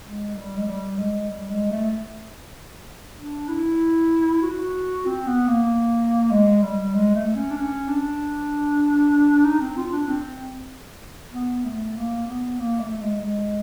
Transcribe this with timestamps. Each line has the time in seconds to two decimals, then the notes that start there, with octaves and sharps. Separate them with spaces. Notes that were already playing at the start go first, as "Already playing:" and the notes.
0.03 G#3
0.34 G3
0.57 G#3
0.66 G3
0.97 G#3
1.29 G3
1.50 G#3
1.71 A3
3.17 D4
3.48 E4
4.42 F#4
5.06 C4
5.27 B3
5.48 A#3
6.31 G#3
6.62 G3
6.94 G#3
7.15 A3
7.35 C#4
7.50 D4
7.56 C#4
7.88 D4
9.45 D#4
9.61 C4
9.77 F4
9.92 D4
10.08 C4
11.33 B3
11.65 A3
11.96 A#3
12.27 B3
12.59 A#3
12.80 A3
12.92 A3
13.01 G#3
13.22 G#3